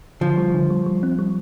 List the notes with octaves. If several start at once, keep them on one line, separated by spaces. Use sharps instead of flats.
D3 F3
G3
D3
G3
G3
C4
G3